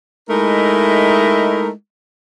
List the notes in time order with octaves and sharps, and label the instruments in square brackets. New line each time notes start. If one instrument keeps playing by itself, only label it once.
[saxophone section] G#3 A3 D#4 E4 A#4